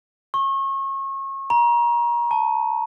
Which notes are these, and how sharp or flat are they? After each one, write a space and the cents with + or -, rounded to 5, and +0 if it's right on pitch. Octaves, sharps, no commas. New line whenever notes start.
C#6 -30
A#5 +30
A5 +0